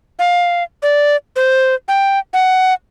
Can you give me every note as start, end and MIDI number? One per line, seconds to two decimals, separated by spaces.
0.19 0.63 77
0.83 1.16 74
1.36 1.75 72
1.88 2.19 79
2.34 2.74 78